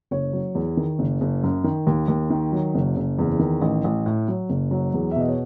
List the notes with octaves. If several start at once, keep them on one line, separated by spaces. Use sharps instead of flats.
F#1 C#5
F#3
E2
D#3
F#1
F#1
F#2
D#3
D#2
D#2
D#3
F#3
F#1
F#1
E2
D#3
A1
A1
A2
F#3
F#1
F#3
E2
E5
B2 D#5
C#5